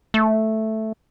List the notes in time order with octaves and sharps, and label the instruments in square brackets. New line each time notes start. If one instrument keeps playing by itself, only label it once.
[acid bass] A3